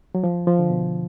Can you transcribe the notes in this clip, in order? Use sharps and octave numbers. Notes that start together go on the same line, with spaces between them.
F#3
F3
F3
D3
B2